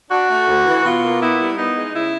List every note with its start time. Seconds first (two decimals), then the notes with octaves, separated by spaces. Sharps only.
0.11 D4 F#4
0.29 A3
0.48 D2
0.66 E3
0.84 B2 F4
1.03 A#3
1.20 B3 E4
1.39 G3
1.56 B3 D#4
1.76 G#3
1.93 C#3 E4